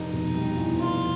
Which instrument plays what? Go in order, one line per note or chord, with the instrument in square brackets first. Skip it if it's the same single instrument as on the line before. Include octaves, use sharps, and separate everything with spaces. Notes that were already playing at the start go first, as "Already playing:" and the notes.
Already playing: [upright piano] F1 [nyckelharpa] D#4
[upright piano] B2
G3
E2
[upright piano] F1 [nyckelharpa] F4